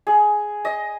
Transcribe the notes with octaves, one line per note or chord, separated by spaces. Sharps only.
G#4
D#5